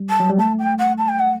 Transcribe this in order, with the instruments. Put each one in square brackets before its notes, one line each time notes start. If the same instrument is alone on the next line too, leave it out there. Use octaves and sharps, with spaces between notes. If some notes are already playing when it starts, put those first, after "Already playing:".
Already playing: [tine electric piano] G3
[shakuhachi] A5
[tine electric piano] F#3
G3
[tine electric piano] A3 [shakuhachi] A5
[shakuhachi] G5
F#5
A5
G5
F#5